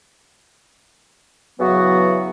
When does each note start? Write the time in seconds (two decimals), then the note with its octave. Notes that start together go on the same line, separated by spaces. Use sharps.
1.60 E2 C#3 E3 F#3 B3 F#4